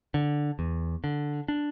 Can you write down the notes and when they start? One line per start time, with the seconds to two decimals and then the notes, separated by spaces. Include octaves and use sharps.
0.14 D3
0.59 E2
1.04 D3
1.48 D4